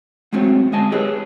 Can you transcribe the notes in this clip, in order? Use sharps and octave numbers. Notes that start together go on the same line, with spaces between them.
F#3 G#3 A3 C4 C#4
D2 G#3 D#5 G#5 A5
G4 G#4 B4 C#5